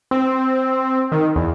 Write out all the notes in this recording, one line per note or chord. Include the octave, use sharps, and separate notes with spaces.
C4
D#3
E2